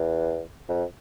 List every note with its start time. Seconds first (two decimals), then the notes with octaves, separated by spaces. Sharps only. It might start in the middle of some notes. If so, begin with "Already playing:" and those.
Already playing: E2
0.69 F2